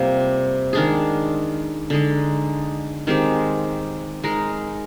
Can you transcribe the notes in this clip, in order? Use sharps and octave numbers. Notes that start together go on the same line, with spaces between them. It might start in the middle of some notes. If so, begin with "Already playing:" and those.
Already playing: C3 G3 A#3 F4
D#3 G#3 D4 G#4
D3 G#3 D#4
D#3 G#3 C4 G4
G#3 D#4 A#4